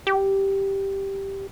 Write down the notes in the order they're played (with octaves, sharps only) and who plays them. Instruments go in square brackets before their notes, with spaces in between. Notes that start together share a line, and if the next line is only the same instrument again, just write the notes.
[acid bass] G4